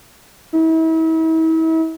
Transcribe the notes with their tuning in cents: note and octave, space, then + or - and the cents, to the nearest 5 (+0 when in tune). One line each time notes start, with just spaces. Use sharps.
E4 -40